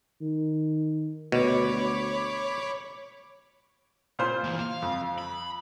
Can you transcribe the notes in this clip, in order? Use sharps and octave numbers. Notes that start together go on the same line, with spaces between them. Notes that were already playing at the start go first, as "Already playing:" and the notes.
D#3
D2 B2 C#5 B5 D6
A#2 F4 C5
E3 A#3
F5
F2
B5